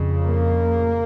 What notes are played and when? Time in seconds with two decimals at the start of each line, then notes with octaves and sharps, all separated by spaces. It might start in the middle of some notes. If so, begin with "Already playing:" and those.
Already playing: F2 C#3
0.24 A#3